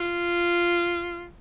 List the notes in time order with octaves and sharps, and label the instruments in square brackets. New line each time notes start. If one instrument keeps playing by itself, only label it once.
[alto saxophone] F4